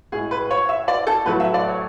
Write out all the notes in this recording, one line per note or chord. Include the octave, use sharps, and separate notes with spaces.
A2 G#3 G#4
B4
C#5
E5
D5
A4
A2 F#3 A3 B4
E5
D5
C#5